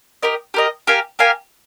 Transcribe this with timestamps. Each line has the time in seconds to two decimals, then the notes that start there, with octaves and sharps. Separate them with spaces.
0.23 G4 A#4 D#5
0.54 G4 A#4 D#5
0.87 G4 A#4 F5 G#5
1.19 G4 A#4 F5 G#5